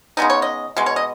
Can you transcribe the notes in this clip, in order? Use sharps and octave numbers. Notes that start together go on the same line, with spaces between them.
C#3 G#3 B3 D#4 D#5
C#5
D#5
B2 G#3
C#5
D#5